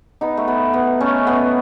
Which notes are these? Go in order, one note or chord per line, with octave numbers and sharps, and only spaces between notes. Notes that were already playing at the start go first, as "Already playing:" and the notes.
B3 D#4
A3
B3
B3
A3 C#4
B3